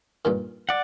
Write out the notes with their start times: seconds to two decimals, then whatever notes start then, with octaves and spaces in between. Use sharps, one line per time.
0.25 G2 A#2 D#3
0.69 D5 F#5